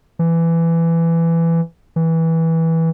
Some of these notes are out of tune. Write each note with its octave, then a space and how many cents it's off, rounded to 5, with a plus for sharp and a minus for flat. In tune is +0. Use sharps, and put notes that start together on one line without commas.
E3 +15
E3 -15